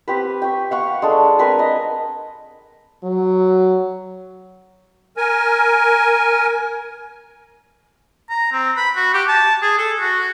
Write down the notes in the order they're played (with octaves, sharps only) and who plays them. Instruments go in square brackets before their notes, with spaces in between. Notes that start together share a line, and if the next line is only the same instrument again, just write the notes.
[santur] C4 G4 B4
G5 C#6
F5 F#5 C#6
G#3 D4 A4
C4 A#4 B4 G#5
D#5
[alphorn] F#3
[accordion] A#4 G#5
[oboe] A#5
C4
B5
F#4
G4
A5
G#4
A4
F#4